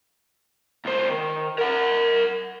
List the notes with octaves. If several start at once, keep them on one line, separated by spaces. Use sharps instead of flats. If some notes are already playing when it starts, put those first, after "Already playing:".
C#2 C5
D#3
A#4 F#5